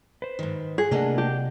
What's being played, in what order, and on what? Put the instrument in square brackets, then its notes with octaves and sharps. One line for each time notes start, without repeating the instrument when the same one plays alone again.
[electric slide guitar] B4 C5
[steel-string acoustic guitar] G#2 D#3
[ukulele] G#4 [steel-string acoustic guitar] F#5
[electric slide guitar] C3 D#5 F#5 [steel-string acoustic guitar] A3 A#3 D4
[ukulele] G4